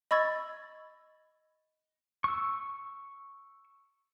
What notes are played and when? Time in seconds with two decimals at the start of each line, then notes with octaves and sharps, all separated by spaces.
0.11 D#5 B5 C#6 E6 G#6 A6
2.24 C#6 E6